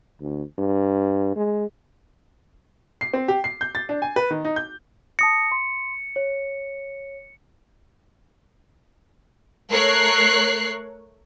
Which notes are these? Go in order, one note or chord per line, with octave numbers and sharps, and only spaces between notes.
D2
G2
G#3
C7
C4
G4
C7
G6
A6
D4
G#5
B4
D#3
D#4
G6
A5 D#6 A#6 C#7
C6
C#5
A3 A#4 C#5 F#6 C7